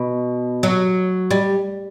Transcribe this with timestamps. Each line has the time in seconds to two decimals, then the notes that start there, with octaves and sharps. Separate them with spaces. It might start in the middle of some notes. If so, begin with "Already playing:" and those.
Already playing: B2
0.63 F#3
1.31 G3